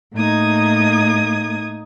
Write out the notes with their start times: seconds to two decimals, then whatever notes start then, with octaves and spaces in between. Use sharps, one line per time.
0.14 A2 A#3 D#4 D#6 G#6